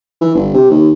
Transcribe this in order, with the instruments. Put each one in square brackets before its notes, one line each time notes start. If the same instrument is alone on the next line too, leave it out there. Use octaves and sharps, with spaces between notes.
[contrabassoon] E3
G1
C3
D#2